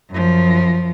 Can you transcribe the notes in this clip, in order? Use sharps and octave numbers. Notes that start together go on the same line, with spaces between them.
F#2 F3